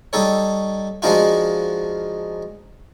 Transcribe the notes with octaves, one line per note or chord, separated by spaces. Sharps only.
G3 D#4 A4 C#5
F3 G#3 D4 D#4 F4 F#4